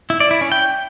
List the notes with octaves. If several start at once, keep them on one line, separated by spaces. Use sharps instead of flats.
E4
D5
E4
C#4
G5